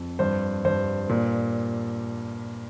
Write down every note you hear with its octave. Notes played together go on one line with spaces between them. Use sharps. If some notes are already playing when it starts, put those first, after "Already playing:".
Already playing: F2
G2 C5
G2 C5
A#2